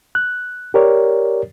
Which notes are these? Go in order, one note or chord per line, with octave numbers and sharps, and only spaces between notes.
F#6
G4 A#4 C#5 D5